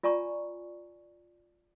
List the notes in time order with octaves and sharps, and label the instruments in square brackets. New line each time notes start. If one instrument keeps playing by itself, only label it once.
[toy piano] F4 D5 G#5 A#5 C#6